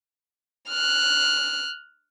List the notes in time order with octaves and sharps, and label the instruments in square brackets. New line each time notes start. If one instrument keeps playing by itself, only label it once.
[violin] F6 F#6